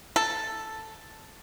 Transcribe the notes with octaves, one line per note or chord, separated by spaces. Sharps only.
A4